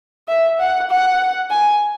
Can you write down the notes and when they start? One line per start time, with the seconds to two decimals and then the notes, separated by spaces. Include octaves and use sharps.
0.28 E5
0.60 F#5
0.90 F#5
1.50 G#5